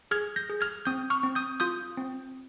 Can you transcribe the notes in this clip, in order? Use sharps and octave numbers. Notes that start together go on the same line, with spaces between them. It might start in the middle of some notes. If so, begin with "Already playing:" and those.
G#4 F6 G#6
G6 A#6
G#4
F6 G#6
C4 D#6 G6
C#6 F6
C4
D#6 G6
F4 D#6 G6
C4